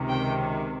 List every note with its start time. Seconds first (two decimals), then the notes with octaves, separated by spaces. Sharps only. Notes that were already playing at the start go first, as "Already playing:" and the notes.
Already playing: C#2 C3 D#3
0.09 G5